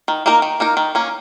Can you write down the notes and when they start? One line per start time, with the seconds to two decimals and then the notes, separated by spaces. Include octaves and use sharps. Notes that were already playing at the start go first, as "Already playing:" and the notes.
0.08 D#3
0.26 A#3 D#4 A#4
0.42 D#3
0.60 A#3 D#4 A#4
0.77 D#3
0.95 A#3 C#4